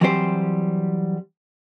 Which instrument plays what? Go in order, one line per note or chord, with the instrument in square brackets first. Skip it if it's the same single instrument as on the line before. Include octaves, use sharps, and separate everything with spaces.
[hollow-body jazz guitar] E3 F#3 G3 C4 G4 C5